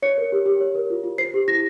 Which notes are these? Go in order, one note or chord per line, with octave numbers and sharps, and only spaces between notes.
C#5 C#7
A#4
G4
G4
C#5
A#4
F4
F4
C5 C7
G4
E4 A#6